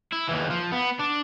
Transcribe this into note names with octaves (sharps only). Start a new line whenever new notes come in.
E4
D#2 E3
F3
B3
D4